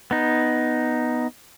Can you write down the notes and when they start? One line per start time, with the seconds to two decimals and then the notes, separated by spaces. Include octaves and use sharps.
0.11 B3 D#4